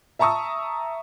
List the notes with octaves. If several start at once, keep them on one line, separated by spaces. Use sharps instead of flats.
E5 A5 A#5 C#6 D#6 E6